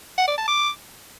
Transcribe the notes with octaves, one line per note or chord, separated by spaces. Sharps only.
F#5
D5
A5
D6